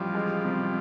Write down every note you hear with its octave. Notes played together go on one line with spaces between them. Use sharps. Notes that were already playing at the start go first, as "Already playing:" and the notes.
Already playing: A1 F3 G3
G#3
C3